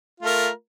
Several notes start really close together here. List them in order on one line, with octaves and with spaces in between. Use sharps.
F4 A3 A#4